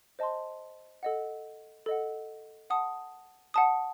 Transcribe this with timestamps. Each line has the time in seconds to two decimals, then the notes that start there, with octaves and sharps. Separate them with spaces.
0.19 C5 D#5 A5 C6
1.03 A4 D#5 F#5
1.86 A4 D#5 F#5
2.70 F#5 A5 D#6
3.54 F#5 A5 D#6